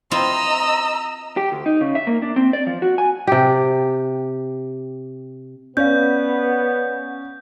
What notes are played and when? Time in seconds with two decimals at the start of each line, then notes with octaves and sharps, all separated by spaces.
0.11 C4 E4 F4 D#5 A#5 E6
1.37 G4
1.52 D2
1.66 D#4
1.81 C#3
1.95 E5
2.07 A#3
2.22 D4
2.36 C4
2.53 D5
2.67 F3
2.82 F#4
2.98 G#5
3.27 C3 G4
5.77 B3 C#4 D5 F5 G6